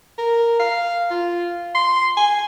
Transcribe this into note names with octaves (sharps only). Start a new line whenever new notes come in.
A#4
F5
F4
C6
G#5